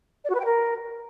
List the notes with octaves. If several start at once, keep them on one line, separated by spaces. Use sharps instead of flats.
D5
F#4
B4
G5
A#4